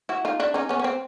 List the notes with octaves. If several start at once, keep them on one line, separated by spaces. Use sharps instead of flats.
E4 F#4
D#4 F4
D4 E4
C#4 D#4
B3 C#4
C#4
C4